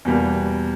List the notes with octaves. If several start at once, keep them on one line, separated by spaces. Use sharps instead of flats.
E2 B2 G3 A#3